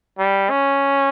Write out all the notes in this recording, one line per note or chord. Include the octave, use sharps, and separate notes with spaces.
G3
C#4